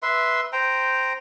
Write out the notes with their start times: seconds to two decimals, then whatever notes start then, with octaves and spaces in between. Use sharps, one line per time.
0.02 B4 E5 C6
0.53 C5 G5 A#5